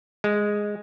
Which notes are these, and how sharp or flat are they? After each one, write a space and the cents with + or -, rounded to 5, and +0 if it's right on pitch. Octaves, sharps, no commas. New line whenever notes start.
G#3 -5